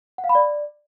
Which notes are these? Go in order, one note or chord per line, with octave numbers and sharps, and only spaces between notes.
F#5
F5
B5
D5